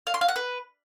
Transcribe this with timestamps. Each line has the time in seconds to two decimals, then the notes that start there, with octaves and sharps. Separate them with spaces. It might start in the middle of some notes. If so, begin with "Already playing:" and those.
0.07 F5
0.14 C6
0.21 F5
0.28 F#5
0.36 B4